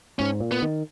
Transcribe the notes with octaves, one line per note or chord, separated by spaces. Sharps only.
G#2 C#4
A#2
B3
D#3